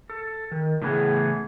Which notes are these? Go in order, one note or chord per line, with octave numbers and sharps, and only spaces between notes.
A4
D#3
A2 C#3 E3 B3 G#4